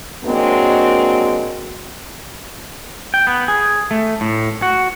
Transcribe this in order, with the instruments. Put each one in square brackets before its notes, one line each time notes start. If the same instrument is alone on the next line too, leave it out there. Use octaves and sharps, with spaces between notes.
[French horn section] F#3 G#3 A#3 C4 D4 F#4
[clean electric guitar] G5
B3
G#4
A3
A2
F#4